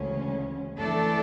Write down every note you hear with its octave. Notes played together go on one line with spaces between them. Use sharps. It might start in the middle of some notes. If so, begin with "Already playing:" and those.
Already playing: D2 C#3 E3 G#3 C#4
E3 A3 D4 A4 D5